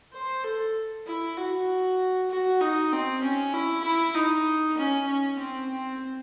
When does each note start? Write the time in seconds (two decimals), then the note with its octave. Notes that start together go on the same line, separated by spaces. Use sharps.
0.13 C5
0.44 A4
1.07 E4
1.37 F#4
2.30 F#4
2.61 D#4
2.92 C4
3.23 C#4
3.53 E4
3.84 E4
4.15 D#4
4.77 C#4
5.07 C#4
5.39 C4
5.70 C4